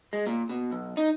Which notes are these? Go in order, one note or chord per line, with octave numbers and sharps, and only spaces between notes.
G#3
A#2
B2
B1
D#4